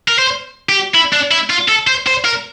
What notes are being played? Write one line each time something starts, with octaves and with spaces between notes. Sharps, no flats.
A#4
C5
G4
E4
D4
E4
F4
A4
C5
C5
A#4